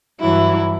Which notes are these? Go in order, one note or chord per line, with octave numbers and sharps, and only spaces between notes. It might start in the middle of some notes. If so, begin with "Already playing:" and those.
G2 E3 F#3 E4